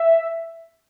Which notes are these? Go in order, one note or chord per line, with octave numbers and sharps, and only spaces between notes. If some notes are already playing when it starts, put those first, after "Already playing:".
Already playing: E5